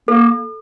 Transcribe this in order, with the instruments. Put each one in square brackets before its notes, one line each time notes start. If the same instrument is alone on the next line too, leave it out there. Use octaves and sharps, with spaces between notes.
[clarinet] A#3 [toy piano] A4